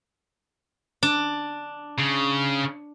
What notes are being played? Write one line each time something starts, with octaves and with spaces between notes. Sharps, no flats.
D4
C#3